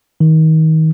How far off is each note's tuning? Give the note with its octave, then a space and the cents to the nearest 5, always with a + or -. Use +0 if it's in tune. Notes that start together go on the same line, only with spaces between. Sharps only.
D#3 +30